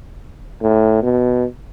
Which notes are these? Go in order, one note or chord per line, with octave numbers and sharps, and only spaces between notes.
A2
B2